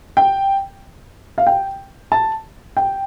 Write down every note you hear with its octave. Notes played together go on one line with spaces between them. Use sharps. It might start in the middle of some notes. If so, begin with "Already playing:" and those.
G5
F5
G5
A5
G5